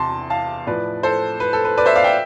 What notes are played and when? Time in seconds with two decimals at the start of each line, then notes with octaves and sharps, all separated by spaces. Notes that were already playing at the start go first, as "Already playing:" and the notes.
Already playing: E2 C3 E3 A5 C6
0.30 F5 A5
0.67 A2 F3 B4 D5
1.03 A4 C5
1.40 B4
1.53 A4
1.65 B4
1.78 B4 D5
1.86 C5 E5
1.95 D5 F5
2.04 E5 G5